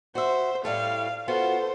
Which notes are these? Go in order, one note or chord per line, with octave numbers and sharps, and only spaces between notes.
F#4 C5 E5
A2 G3 A3 F5
B3 F4 F#4 A4 C5